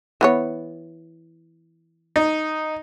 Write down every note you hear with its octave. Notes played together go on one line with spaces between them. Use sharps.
E3 B3 C#5
D#4